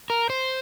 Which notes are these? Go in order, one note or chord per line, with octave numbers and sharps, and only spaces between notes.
A#4
C5